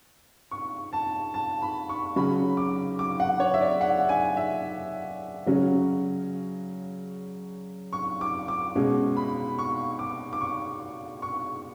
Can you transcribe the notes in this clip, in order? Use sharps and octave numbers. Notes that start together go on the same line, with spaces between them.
C#6
A5
A5
B5
C#6
C#3 F#3 C#4 B5
D6
D6
F#5
C#5
E5
D5
F#5
G#5
E5
C#3 F#3 C#4
C#6
D6
D6
B2 G#3 C#4
B5
C#6
D6
D6
C#6
C#6